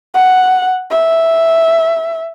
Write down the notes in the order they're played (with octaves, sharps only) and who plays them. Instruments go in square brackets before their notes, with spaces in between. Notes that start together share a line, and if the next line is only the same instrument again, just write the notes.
[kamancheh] F#5
E5